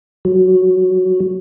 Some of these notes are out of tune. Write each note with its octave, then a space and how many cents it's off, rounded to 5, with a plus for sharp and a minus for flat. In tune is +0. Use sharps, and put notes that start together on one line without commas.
F#3 +0